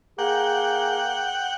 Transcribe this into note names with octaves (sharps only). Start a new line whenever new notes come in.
A#3 G#4 F#5 G5